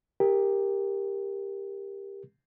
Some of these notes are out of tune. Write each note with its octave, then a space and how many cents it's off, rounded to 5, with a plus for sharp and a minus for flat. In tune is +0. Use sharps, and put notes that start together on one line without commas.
G4 +15 A#4 +0